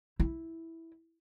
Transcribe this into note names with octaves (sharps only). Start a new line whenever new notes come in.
E4